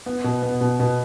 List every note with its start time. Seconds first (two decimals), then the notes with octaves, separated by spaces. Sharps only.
0.06 B3
0.24 B2
0.42 B3
0.61 B2
0.80 B2